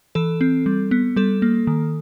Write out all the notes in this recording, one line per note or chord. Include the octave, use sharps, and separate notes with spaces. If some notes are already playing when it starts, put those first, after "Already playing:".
E3 A4
C4
G3
B3
G3 A4
A#3
D#3